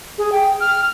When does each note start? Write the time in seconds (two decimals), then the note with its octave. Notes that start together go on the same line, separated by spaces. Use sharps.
0.18 G#4
0.32 G5
0.60 F6